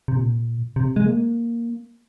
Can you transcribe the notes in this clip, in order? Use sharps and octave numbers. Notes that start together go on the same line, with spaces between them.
C3
A#2
C3
G#3
A#3